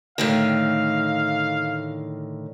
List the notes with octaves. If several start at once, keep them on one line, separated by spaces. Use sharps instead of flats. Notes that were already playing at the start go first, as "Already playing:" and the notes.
A2 D3 D#3 F5